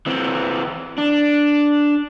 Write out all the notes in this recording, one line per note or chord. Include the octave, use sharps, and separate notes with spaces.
E3 C4
D4